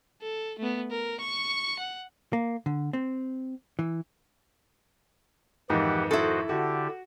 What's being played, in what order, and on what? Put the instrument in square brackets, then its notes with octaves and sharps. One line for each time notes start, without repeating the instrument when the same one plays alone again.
[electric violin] A4
A3 B3
A#4
C#6 C#7
F#5
[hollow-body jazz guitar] A#3
D3
C4
E3
[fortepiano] F2 G#2 D#3 [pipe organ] E3 G4 F#5
[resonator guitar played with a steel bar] E4 A4 [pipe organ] F#4 C5 D#5
[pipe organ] D3 G4 [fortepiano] F#4